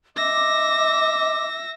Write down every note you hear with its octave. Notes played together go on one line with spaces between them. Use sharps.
D#5 E5 D6 A#6